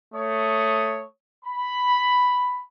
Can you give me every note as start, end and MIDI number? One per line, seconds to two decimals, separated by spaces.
0.15 1.04 57
0.15 1.04 73
0.15 1.04 87
1.45 2.61 83